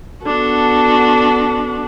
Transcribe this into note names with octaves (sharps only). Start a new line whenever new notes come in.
B3 D4 F#4 A4